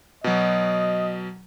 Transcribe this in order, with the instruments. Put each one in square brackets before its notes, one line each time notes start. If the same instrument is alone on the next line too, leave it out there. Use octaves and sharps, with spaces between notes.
[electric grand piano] B2 F#3 [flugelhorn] D#5